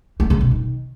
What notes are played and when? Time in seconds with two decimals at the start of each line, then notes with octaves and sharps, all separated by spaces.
0.20 A3
0.30 C#3
0.41 B2
0.51 D#3